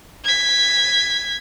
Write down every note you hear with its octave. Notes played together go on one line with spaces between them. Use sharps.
G#6 B6